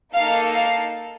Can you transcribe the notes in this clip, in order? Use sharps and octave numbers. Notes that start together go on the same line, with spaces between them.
A#3 D#4 A4 F5
F5